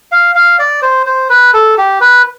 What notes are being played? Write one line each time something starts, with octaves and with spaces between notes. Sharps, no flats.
F5
F5
D5
C5
C5
B4
A4
G4
B4